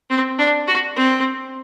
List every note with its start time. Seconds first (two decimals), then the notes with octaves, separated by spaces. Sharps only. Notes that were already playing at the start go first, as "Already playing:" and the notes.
0.10 C4
0.39 D4
0.67 F#4
0.96 C4